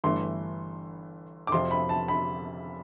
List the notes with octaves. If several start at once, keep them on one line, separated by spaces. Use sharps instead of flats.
G1 G2 E3 A3 C6
D6
F2 C3 F3 C6
B5
A5
B5